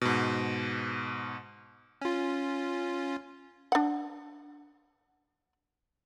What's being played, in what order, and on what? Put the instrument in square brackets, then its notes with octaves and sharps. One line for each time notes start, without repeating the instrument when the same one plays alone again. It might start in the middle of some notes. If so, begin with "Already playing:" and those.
[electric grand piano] G#2 B2
[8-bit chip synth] C#4 F4
[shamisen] D4 F#5